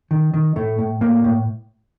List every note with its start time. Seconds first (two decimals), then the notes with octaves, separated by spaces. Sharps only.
0.11 D#3
0.34 D#3
0.56 A2 A3
0.79 A2
1.01 A2 A#3
1.24 A2